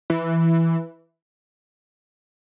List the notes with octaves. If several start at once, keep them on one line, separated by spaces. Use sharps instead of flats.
E3